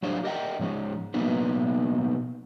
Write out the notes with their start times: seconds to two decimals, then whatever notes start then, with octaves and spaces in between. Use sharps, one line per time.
0.03 F#3 D4 G4 C5 C#5 F5
0.23 G4 A#4 D#5 E5 F#5 G5
0.59 G#2 F3 G#3 C#4
1.14 B2 F#3 A#3 B3 D#4 B4